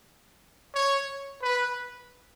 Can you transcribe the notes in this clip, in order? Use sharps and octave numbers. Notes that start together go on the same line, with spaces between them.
C#5
B4